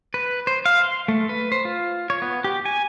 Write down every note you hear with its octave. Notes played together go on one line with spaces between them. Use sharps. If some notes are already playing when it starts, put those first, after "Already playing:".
B4
C5
F5
C6
A3
B4
C5
F4
C#5
B3
G4
G#5